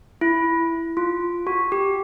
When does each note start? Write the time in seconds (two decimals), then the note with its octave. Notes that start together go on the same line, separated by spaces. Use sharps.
0.21 E4
0.97 F4
1.47 F#4
1.72 G4